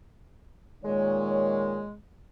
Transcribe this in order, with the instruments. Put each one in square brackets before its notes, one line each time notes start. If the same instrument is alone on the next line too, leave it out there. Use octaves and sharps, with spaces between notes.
[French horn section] A#2 D#3 C#5 [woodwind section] G#3